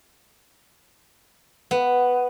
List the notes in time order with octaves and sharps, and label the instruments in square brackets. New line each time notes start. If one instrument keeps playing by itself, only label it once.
[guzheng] B3